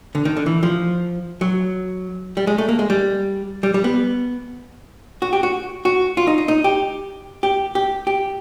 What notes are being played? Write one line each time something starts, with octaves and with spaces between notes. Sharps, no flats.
D3
D#3
D3
E3
F3
F#3
G3
G#3
A3
A#3
G#3
G3
G3
G3
B3
F#4
G4
F#4
F#4
F4
D#4
D#4
D#4
G4
G4
G4
G4